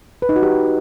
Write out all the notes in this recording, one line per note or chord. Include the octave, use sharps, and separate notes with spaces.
B4
D#4
F#4
G4